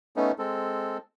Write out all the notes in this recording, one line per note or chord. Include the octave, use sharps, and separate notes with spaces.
A3 B3 C#4 D#4
G#3 C4 A4